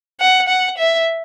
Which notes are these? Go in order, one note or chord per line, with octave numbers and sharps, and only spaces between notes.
F#5
F#5
E5